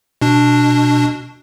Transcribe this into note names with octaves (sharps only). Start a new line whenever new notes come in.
B2 D4